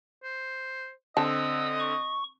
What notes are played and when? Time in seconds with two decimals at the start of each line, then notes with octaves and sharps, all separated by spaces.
0.24 C5
1.17 D3 C4 D#5 A5 E6
1.80 C#6